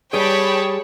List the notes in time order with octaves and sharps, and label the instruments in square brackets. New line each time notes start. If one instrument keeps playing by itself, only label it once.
[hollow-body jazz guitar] G3 B4 D5 [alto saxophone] G#4 [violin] C#5 A5 [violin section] G5 B5